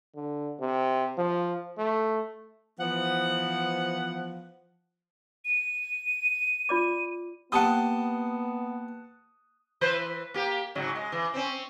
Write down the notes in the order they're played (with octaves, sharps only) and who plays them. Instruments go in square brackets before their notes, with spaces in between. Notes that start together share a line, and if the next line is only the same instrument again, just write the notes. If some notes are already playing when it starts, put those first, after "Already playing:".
[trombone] D3
C3
F3
A3
[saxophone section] E3 F3 B3 C5 F#5
[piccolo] D#7
[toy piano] F4 D5 D6
[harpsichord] A#3 G4 [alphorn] B3 [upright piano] F#5 A5 D#6
[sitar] E3 B4 C5
A#3 G4
G#2 C#3 F#3
G#3
E3
C4 C#4